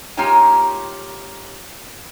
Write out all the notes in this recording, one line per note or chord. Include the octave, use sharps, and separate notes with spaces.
A#3 D#4 F4 G4 C#5 G#5